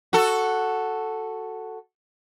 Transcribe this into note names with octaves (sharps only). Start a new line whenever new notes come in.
F#4 A4